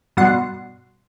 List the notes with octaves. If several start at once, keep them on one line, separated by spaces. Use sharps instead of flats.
G2 B2 F#4 F#5 C6